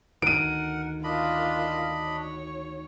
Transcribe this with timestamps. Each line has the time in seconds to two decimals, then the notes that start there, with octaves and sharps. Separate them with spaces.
0.22 D2 D#3 A#4 F#5 D7 D#7
1.04 A#3 D4 F4 D#5 B5
2.09 C#5